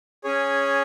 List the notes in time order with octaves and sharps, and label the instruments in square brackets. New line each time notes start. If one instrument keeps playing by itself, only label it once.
[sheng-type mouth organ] C#4 G#4 C#5